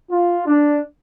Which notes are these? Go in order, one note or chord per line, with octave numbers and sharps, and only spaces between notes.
F4
D4